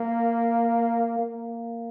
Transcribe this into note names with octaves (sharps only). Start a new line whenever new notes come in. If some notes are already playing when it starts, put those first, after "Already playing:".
Already playing: A#3
A#3